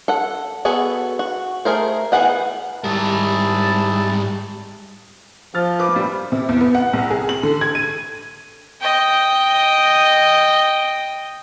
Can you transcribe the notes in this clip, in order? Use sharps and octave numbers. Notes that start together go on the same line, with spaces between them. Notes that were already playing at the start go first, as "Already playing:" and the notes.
A4 F#5
B3 F#4 G#4 A4
F#4
A3 G#4 A#4 C5
E3 B3 G#4 F#5 G5
G#2 G3 E4 G#4 A#4 A5
F3 F6 A6
B4 D6
A#2 G3
C3
E2
B3
F#5
C2
G#4
F#7
D3
G#6
D#7
D#5 G5